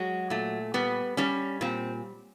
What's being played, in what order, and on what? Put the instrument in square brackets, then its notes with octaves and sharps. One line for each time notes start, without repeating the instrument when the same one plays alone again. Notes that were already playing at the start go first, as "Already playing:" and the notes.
Already playing: [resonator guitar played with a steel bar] F#3 G#3
A#2 A3
G3 B3
G3 C#4
A#2 C4